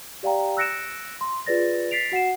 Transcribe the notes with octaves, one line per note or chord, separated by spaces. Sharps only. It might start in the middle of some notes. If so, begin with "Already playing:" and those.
G4 D5 F5 G5 A#5
E6 F#6 A#6 C#7 D7 E7
C6
F4 G#4 B4 D5 A6 A#6
A6 B6 C7 D7 F7
F#4 F#5 C7 E7